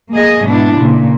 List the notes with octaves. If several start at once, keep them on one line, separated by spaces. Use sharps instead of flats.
A#3 G#4 D#5
G#2 B2 D4 E4
A#2 C#3